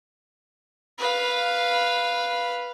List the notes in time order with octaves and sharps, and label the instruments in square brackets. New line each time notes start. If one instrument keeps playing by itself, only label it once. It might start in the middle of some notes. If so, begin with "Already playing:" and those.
[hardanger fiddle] B4 F5